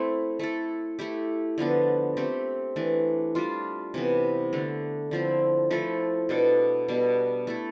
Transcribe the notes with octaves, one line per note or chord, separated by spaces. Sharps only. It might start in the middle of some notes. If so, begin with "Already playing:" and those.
Already playing: A3 C4 E4
A3 E4 A4
A3 E4 G4
D3 F3 B3 D4
A3 C4 G4
E3 A3 D4
G3 D4 F4
C3 E3 B3
D3 A3 D4
D3 F3 C4 E4
F3 A3 E4 A4
B2 B3 D4 A4
B2 G3 D4
A3 E4 A4